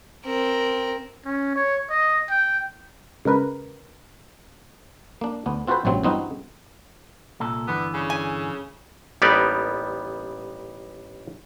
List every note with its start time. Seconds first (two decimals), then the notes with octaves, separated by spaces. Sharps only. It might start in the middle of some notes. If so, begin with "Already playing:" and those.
0.25 C4 A#4
1.25 C#4
1.56 C#5
1.90 D#5
2.30 G5
3.25 C#3 G#3 A#4 B4
5.21 A#3 D4
5.46 D2 B3 D4
5.67 C4 F4 F#4 A4 B4 C5
5.85 A1 G2 C3 F#3 C4
6.04 G2 E3 B3 C4 D#4 F#4
7.40 C2 A#2 A4
7.67 G2 D3 E3 B3
7.94 C#3
8.10 G#5
9.22 A1 G3 A#3 B3 D#4 D5